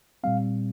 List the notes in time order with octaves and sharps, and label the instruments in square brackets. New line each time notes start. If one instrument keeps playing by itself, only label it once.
[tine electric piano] A#2 G3 C4 F5